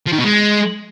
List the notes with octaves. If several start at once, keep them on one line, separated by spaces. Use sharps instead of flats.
F3
D#3
B2
G#3